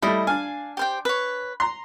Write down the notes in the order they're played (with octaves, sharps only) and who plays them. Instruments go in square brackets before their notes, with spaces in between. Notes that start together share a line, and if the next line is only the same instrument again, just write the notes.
[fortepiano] G3 A3 [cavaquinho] E4 D#5
[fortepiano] D4 G#5 [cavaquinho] F5
[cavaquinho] G4 C5 G5
B4 C#5
[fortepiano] A#5 C6